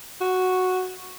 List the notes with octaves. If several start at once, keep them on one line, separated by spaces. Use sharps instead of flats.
F#4